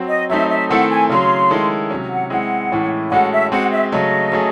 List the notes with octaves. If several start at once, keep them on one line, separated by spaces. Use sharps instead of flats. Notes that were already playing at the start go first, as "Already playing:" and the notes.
Already playing: F#3 C4 F#4
D#5
F#3 A3 C4 D#4 E5
E5
D#3 A3 C4 E4 A4 F#5
G#5
C#3 F#3 C#4 C6
D#3 G#3 C#4 E4 A4
C3 F#3 C#4
F#5
G#3 C4 E4 F#5
A2 E3 G#3 C#4 E4
A2 G#3 C#4 F#4 A4 F#5
E5
G#3 C4 F#4 F#5
E5
C#3 F#3 A3 D#5
F#3 A3 C#4 G#4